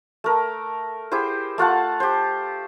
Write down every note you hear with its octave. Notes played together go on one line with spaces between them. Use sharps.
A3 A#4
E4 G4 G#4 C5
A3 F4 F#5 A5
G4 C5